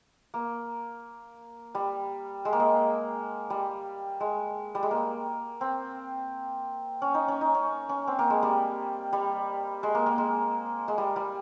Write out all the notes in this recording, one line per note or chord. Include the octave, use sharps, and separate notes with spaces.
A#3
G3
G#3
A#3
G#3
G3
G#3
G3
G#3
A#3
C4
C#4
D#4
C#4
D#4
C#4
C#4
C4
A#3
G#3
G3
G3
G#3
A#3
A#3
G#3
G#3
G3
G3